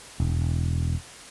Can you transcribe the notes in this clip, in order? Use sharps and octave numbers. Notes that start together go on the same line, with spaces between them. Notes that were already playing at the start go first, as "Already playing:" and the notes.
E1